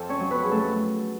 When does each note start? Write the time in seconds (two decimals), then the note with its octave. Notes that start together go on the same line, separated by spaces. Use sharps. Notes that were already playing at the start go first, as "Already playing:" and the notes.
Already playing: F2 A4 A5
0.09 C#4 C#5
0.20 F#3
0.30 B3 B4
0.44 G#4
0.51 F#3 A3 A4